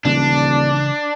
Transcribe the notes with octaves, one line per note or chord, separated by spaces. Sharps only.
D#1 C#3 E3 G#3 D4